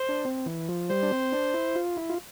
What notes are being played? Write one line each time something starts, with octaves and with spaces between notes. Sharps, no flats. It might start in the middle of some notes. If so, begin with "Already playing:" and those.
Already playing: C5
D4
C4
E3
F3
G3 C5
D4
C4
D4
E4
F4
E4
F4